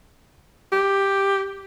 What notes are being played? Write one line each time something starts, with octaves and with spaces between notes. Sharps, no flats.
G4